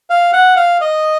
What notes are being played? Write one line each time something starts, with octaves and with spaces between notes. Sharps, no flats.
F5
F#5
F5
D#5